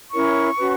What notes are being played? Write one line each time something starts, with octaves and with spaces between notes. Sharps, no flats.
C#4 E4 A#4 C#5 C#6
C#4 F#4 B4